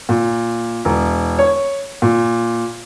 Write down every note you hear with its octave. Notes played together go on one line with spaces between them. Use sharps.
A#2
E1
C#5
A#2